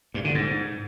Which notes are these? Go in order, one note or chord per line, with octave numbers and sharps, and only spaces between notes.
G2
D3
G#2